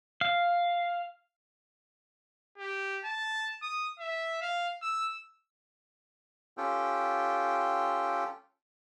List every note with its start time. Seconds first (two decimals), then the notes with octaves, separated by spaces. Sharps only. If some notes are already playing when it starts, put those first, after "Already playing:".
0.21 F5
2.58 G4
3.04 A5
3.62 D#6
3.99 E5
4.42 F5
4.82 E6
6.57 C#4 F4 G4 A4 G5